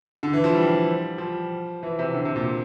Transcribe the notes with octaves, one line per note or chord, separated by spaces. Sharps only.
D3
E3
F3
G3
F3
E3
C3
D3
C3
A#2